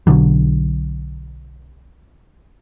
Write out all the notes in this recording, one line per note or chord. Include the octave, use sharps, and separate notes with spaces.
B1 B2 D3 F#3